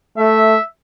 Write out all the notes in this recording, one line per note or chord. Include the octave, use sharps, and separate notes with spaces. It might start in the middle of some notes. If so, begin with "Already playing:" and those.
A3 E5